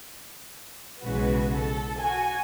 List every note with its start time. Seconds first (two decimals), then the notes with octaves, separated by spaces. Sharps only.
1.02 B1 C#3 E3 G#3 F#4 B4
1.55 A4
2.00 F#4 G#5